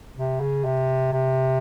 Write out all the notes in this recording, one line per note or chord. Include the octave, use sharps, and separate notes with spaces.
C3
C#3
C3
C3